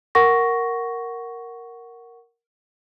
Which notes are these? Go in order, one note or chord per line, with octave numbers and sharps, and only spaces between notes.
A#4 F#5 C#6 A#6